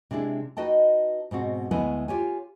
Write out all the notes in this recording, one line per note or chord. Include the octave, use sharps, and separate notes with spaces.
C3 G#3 D4 E4 G#4
D#4 F#4 B4 D#5 G5 A5
G#2 B2 C4 F#4
D2 G#3 A3 B3 E4 G#5
F4 G4 C#5 G#5